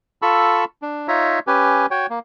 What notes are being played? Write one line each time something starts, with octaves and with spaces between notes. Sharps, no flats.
F4 A4 A5 B5 C#6 E6
D4
D#4 F4 C#5 E5 A#5
C#4 G4 B4 G#5
F#4 C#5 G5
A#3